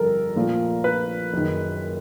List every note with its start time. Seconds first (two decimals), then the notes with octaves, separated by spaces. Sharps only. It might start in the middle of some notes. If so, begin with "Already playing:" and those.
Already playing: G1 F2 D3 G3 A4 A#4
0.35 A#1 A#2 F3 A3
0.84 B4
1.33 F#1 D#3